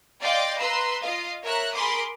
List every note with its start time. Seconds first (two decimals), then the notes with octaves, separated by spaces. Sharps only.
0.20 D5 D#5 F5 G5 C6 D6
0.58 B4 A#5 C6 E6
1.00 F4 D#5 F5
1.43 A#4 C#5 E5 A#5 F#6
1.74 G#4 A#4 B5 C6 D6 D#6